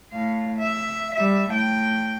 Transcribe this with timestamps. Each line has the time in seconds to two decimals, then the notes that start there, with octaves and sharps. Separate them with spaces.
0.12 A2 F5
0.58 E5
1.14 G3 E5
1.50 A2 G5